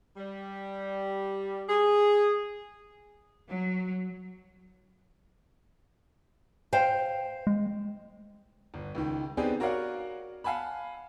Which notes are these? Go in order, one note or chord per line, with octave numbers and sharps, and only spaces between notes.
G3
G#4
F#3
C5 F5 G5
G#3
G1
C#2 D#3
B3 C4 D4 D#4 G4 G#4
F#4 A#4 C#5 D5 F5 F#5
F5 F#5 G#5 A5 B5